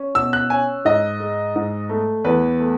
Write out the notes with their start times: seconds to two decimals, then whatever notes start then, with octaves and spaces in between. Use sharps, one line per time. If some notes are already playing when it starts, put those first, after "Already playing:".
Already playing: C#4
0.15 B2 E6
0.33 F#6
0.50 C#4 G#5
0.85 G#2 D#5
1.20 G#3
1.56 G#2
1.89 A3
2.24 E2 B4
2.59 A3